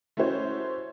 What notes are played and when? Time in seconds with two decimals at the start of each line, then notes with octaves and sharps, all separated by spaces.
0.17 A3 C#4 E4 F#4 C5 C#5